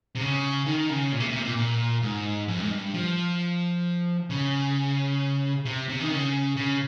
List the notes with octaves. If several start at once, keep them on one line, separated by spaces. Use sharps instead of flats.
C3
C#3
D#3
C#3
A#2
C3
A#2
C3
A#2
A#2
G#2
F2
G#2
G2
F3
C#3
C3
C3
D#3
C#3
C#3